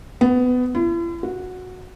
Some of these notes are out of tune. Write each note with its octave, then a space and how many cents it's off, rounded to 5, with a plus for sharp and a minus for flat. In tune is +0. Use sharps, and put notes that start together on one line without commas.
B3 +20
E4 +45
F#4 -10